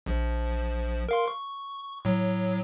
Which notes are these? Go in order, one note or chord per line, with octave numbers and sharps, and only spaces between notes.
A#1 F3
A#4 F5 C6
C#6
A2 F#3